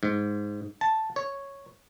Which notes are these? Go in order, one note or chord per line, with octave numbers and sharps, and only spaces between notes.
G#2
A5
C#5